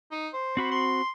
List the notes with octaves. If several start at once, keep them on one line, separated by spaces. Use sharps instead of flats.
D#4
C5
C4 F#4 B5
C6